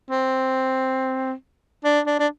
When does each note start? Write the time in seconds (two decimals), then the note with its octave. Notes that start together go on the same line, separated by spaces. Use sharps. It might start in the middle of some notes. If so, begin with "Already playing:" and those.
0.10 C4
1.84 D4
2.06 D4
2.19 D4